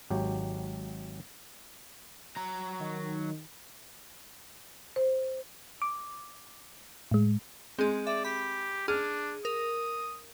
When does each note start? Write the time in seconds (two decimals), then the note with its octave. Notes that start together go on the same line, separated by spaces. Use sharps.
0.10 G#1 F#3 G4
2.37 F#3 A#5
2.80 D#3
4.96 C5
5.82 D6
7.11 A2 G#3
7.79 G#3 C4 G#4
8.07 D5 E5
8.25 G4 B5
8.88 D4 G#4 F6
9.45 A#4 D#6